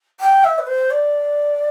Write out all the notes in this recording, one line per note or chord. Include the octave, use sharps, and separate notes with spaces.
G5
E5
B4
C5
D5